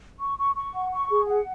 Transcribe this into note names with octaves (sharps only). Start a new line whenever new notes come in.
C#6
C#6
C#6
F#5
C#6
G#4
F#5